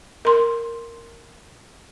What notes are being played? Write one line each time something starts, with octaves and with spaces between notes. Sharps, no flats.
A#4 C6